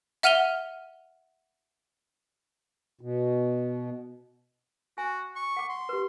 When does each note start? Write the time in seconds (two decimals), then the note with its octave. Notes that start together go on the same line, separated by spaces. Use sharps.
0.23 E5 F#5 F6 D#7 F7 G7
3.01 B2
4.98 F#4 G#5
5.36 C#6
5.57 F#5 D6
5.69 C6
5.89 G4 B4